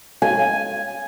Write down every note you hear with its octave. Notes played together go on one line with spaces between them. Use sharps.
G#5